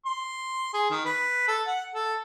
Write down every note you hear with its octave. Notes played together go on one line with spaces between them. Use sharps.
C6
G#4
D#3
B4
A4
F#5
A4